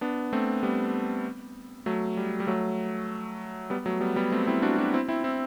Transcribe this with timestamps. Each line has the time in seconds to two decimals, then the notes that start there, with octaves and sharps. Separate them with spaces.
0.01 B3 D4
0.33 A3 C4
0.63 G3 B3
1.86 F#3 A3
2.17 G3
2.40 G3
2.47 F#3 A3
3.70 G3 B3
3.86 F#3 A3
4.01 G3 B3
4.16 G3 B3
4.32 A3 C4
4.47 C4 E4
4.62 D4 F#4
4.78 D4 F#4
4.93 C4 E4
5.08 C4 E4
5.24 C4 E4